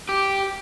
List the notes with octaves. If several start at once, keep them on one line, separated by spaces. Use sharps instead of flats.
G4